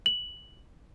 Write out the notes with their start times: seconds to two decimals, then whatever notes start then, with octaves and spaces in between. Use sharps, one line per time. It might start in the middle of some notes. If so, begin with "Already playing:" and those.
0.06 F#7